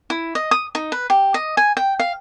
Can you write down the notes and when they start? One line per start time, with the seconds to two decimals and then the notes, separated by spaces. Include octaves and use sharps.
0.10 E4
0.35 D#5
0.51 D#6
0.75 D#4
0.92 B4
1.10 G4
1.34 D#5
1.57 G#5
1.77 G5
2.00 F5